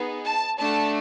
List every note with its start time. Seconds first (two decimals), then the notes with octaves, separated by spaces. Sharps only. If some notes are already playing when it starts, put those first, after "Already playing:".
Already playing: B3 D#4 G#4
0.24 A5
0.59 A3 D4 F#4 A5